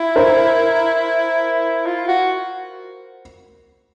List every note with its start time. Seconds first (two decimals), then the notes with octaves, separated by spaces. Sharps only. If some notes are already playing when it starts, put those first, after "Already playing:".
Already playing: E4
0.16 A#4 C5
1.86 F4
2.08 F#4